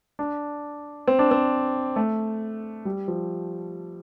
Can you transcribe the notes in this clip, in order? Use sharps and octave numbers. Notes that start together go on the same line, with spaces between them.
D4
C4
D4
C4
A3
G3
F3